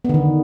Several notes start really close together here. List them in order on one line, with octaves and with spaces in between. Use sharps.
B3 D3 D#3